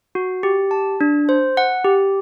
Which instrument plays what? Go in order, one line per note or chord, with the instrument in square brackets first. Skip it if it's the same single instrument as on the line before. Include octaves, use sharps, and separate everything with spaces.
[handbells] F#4
G4
A5
D4
C5
F#5
G4